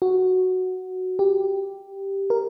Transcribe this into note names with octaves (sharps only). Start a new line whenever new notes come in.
F#4
G4
A#4